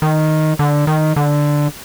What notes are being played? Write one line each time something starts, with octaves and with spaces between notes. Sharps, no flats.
D#3
D3
D#3
D3